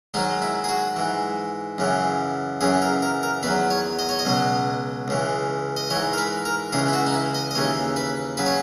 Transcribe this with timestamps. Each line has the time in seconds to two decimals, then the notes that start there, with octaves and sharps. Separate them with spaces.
0.14 G#2 D#3 F#3 D#4
0.42 E4
0.64 G#4
0.69 F#4
0.96 G#2 E3
1.78 F#2 C#3 E3
2.61 F#2 C#3 E3 G#4
2.82 A#4
3.02 A#4
3.23 A#4
3.43 E2 D#3 F#3 B4
3.70 C#5
3.99 D#5
4.09 C#5
4.19 D#5
4.25 C#2 B2 F#3
5.08 C#2 C#3 E3
5.76 D#5
5.90 G#2 E3 C#5
6.13 A#4
6.18 B4
6.45 A#4
6.73 C#2 C#3 E3 G#4
6.88 E4
6.93 F#4
7.07 D#4
7.14 E4
7.35 D#5
7.51 D#5
7.55 D#2 C#3 E3 C#5
7.96 B4
8.37 C#3 F#3 B4
8.46 C#5